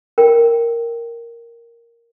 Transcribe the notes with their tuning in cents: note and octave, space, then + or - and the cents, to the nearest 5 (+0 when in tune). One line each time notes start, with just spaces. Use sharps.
A#4 +0 G5 +0